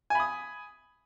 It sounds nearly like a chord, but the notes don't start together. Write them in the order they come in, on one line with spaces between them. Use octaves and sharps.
G#5 B5 D#6